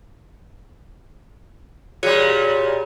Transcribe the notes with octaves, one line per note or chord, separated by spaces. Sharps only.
A#2 G3 F#4 G#4 C#5